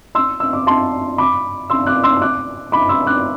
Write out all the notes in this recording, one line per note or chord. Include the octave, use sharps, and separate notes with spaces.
C6 E6
E6
D6
A5 C6
B5 D6
C6 E6
D6 F#6
C6 E6
D6 F#6
B5 D6
C6 E6
D6 F#6